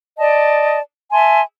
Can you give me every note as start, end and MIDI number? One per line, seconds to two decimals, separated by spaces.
0.19 0.79 74
0.19 0.79 75
0.19 0.79 81
1.12 1.42 76
1.12 1.42 80
1.12 1.42 81
1.12 1.42 84